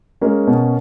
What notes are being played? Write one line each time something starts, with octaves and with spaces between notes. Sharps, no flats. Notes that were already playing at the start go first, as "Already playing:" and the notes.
G#3 A#3 C#4
B2